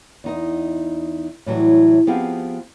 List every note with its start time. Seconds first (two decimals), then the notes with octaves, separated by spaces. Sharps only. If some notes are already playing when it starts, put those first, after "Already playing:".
0.24 E2 D#4 D#5
1.46 A2 E3 F#3 G3
2.07 F3 B3 C4 F4 G4 G#4